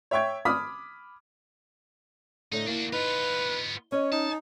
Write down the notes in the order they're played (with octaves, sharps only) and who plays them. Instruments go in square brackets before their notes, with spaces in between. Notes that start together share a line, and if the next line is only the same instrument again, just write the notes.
[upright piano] C#5 E5 G5 C#6 G#6
B5 D6 D#6 F6 B6
[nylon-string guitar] A2 D3 A3 [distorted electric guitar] D#4
[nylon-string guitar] A#3 [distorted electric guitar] D4 F#4
[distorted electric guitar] B3 F4 [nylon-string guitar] D#4 [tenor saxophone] B4
[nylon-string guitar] C#4 D#5 [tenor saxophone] C#5
[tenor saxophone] D#4 [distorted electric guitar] A5